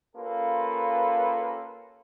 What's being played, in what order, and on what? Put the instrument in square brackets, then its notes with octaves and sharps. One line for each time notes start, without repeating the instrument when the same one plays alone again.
[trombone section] A#3 C#4 F4 G4 A4 B4